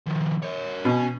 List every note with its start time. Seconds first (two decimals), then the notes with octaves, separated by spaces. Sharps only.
0.07 D#3 F3
0.43 A#4 C#5
0.85 B2 C#4 G#5